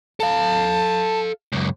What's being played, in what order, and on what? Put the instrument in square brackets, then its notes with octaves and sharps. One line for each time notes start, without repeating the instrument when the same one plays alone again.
[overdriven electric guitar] A4 F5 [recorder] A5
[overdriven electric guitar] C#2 F#2